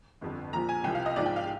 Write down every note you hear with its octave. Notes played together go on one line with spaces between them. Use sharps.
G1 F2 D3
A#1 A#2 F3 A#5
G#5
C2 C3 F3 G5
F5
D#5
A#1 G#2 F3 D5
G5
F5